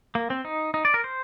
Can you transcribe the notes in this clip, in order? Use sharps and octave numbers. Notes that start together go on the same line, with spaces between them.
A#3
C4
D#4
D#4
D5
A#4
C5